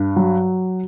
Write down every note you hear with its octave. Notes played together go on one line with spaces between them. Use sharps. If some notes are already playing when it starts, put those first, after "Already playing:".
Already playing: G2
F#3